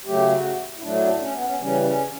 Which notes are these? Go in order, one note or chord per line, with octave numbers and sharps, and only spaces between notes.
C#3 F#3 A3 G4
F#4
E4
A2 F#3 A3 D4
C#4
B3
C#4
C#3 E3 G3 C#4
C#4